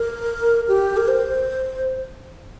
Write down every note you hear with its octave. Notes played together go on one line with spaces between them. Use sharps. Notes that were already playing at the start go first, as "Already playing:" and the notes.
Already playing: A#4
G4
A#4
C5